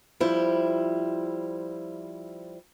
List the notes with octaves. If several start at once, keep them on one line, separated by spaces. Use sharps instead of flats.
F3 G3 E4 C5